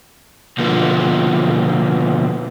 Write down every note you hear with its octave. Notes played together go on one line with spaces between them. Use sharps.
B2 D3 F3 A#3 B3